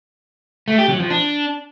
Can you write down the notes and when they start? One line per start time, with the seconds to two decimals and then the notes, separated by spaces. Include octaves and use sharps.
0.68 A3
0.78 G4
0.89 F#3
1.00 F3
1.10 D4